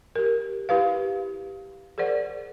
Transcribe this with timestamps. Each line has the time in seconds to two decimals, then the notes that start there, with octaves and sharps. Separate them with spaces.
0.15 G4 A#4
0.69 E4 G4 B4 F5
1.98 G#4 A#4 C5 D5 F#5